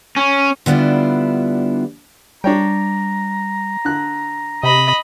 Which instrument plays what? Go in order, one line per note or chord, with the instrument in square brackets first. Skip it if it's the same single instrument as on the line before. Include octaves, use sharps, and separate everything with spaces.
[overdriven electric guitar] C#4
[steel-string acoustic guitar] D3 G3 B3 D4 E4 F4
[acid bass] G3 [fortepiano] D4 C#5 G5 [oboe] A#5
[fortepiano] D3 F#6
[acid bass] C3 [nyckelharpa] D#5 B5